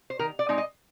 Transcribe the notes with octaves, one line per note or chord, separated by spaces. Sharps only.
C5
D#3 A#4
D5
G#3 C4 D#4
D#5